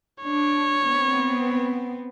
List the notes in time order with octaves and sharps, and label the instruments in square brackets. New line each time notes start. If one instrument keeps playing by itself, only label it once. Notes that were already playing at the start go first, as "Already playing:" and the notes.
[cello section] D4 [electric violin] C#5
[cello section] B3 C4